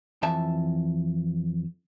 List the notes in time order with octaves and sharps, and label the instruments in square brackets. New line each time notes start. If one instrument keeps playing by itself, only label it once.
[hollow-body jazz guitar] F2 E3 E5 A5